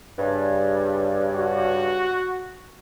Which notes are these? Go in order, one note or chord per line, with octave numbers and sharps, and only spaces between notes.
G2 C#3
F#4